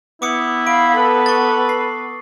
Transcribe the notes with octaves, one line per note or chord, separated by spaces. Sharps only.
B3 E4 D6 D#6 C#7
F5 B5 D7
A4 B4
C#6 A6
C7